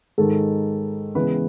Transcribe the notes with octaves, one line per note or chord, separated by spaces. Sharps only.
G#2 D#3 G#3 A4
C#3 E3 G#3 B3 B4